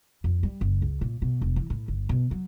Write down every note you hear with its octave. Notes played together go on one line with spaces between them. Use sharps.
F2
G3
F#1
C#2
A#2
B2
E1
E3
A2
G1
B2
F#3